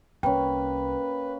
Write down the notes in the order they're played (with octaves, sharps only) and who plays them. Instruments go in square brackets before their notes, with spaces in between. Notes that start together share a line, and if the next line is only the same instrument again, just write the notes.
[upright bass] C2 [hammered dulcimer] A#3 C#4 [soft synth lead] B4 [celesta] G5